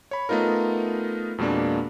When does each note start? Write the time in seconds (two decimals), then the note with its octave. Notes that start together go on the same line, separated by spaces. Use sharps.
0.11 C#5 B5
0.29 A3 B3 D#4 F4 A#4
1.38 F2 B2 G#3 A#3 D4